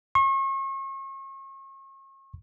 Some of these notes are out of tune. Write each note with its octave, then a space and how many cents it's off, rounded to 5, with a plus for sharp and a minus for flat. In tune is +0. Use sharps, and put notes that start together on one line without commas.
C#6 -40